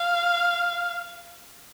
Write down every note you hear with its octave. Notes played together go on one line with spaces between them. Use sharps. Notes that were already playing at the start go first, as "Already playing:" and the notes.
Already playing: F5